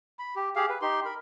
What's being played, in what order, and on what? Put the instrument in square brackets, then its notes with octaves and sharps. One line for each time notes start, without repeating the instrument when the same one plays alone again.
[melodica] B5
G4
G4 G#4 F5
B4
D#4 G4 C6
A#4 B5